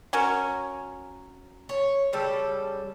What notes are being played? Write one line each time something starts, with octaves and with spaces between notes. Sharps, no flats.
F#3 C#4 A#4
C#5
C#3 G3 A4